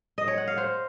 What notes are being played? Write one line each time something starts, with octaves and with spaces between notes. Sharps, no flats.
D#5
C#5
F#5
F5
C5